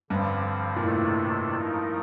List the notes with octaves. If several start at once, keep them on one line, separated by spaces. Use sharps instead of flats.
G2 D3 F3 C4
A#2
A2 C3 D#3 A3 D4 A4
F3 A3 D#4 A#4